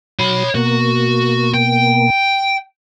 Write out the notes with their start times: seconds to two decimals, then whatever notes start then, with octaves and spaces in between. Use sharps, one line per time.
0.19 F#3 C#5 B5
0.55 B2 A#3 F#4
1.54 G5